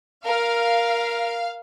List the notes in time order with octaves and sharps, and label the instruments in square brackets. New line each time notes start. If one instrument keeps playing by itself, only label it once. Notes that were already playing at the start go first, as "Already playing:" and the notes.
[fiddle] A#4 [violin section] F5